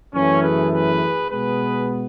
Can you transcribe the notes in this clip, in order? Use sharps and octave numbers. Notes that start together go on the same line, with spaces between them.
F#2 E3 A3 C#4
G#4 B4
G#4 B4
B2 G#3 B3 G#4 B4